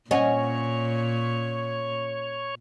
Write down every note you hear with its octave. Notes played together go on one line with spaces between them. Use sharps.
A#2 C#4 C#5 D#5 F#5 G#5